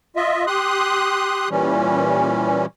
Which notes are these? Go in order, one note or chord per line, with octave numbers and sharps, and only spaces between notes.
F4 D#5 E5
G4 C6 D#6 F#6
A#2 E3 G3 C#4